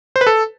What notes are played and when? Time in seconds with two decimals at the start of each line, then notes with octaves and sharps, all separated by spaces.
0.16 C5
0.21 B4
0.27 A4